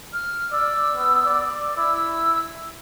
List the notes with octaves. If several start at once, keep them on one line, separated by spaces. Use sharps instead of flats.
F6
D5 E6
B3
D5
E4 E6